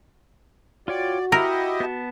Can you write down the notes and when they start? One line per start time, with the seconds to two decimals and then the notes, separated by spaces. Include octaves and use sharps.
0.88 F4 F#4 C#5 D5 G5
1.32 E4 G4 A#4 D#5 F#5 B5 E6
1.80 B3 A5